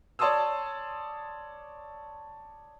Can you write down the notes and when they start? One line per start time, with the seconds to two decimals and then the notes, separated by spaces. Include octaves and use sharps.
0.19 C#5 D5 A5 C6 D#6 E6